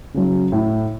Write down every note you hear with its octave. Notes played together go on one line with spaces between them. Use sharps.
C#3 F#3
A2